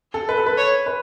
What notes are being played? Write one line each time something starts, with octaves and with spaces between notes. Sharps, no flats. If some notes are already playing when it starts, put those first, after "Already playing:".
A4
B4
A4
B4
C#5
B4